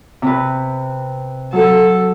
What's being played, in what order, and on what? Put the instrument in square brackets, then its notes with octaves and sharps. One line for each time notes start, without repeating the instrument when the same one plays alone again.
[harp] C3 B4
[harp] F#3 [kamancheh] A4